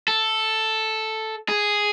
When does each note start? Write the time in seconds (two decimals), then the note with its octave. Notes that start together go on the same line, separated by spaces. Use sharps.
0.08 A4
1.49 G#4